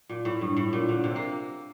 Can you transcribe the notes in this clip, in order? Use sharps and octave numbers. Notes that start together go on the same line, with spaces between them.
A#2
A2
G2
A2
A#2
D3
C3
A#3